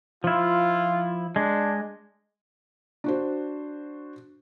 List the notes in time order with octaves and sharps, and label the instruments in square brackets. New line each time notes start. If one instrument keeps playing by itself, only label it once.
[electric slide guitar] F3 E4 [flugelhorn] F4
[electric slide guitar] G#3 [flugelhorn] D4
[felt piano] D4 F#4 C5